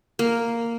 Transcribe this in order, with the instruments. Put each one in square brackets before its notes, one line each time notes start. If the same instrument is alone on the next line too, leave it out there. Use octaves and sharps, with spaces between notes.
[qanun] A#3